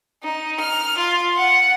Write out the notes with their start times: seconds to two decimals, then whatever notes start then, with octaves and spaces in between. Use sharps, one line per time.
0.22 D#4
0.59 F6
0.97 F4
1.36 F#5